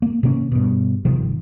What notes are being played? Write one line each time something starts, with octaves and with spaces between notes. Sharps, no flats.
A#3
C3 D#3 A#3 C#4
G2 B2
G1 C3 D#3 F3